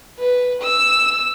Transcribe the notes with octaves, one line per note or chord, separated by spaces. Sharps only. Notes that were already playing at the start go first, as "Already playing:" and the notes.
B4
E6